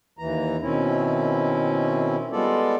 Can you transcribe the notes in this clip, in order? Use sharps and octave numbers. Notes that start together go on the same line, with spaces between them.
D#2 E3 A#5
B2 D#3 C4 C#4 E4
G3 G#3 B3 F4 A4 D5